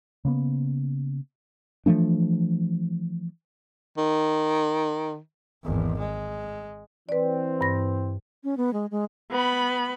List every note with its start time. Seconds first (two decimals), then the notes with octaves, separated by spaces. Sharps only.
0.25 C#3 A#3 B3
1.86 E3 F3 A3 D4
3.98 D#3
5.64 G#1 E2
5.98 G#3
7.09 E3 C4 B4 D5
7.61 G2 A#6
8.44 C#4
8.57 B3
8.73 G#3
8.91 G#3
9.31 B3 B5